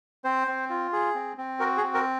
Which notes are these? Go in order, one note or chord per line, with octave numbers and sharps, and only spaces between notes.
C4 C5
C4
F4
G#4
C4
C4
F#4 A#4
G#4
C4
A#4